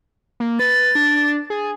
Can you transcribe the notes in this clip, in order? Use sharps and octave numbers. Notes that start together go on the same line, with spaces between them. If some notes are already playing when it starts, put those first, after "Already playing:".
A#3
B4 A6
D4
G#4